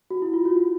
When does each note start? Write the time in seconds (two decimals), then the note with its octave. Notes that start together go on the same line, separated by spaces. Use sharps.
0.10 F#4
0.22 E4
0.33 F4
0.45 F#4
0.57 F#4